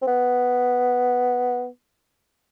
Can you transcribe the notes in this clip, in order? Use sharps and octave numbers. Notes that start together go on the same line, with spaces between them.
C4
B3